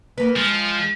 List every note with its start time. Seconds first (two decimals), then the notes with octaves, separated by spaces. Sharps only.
0.18 A#3 B4
0.36 F3 G#3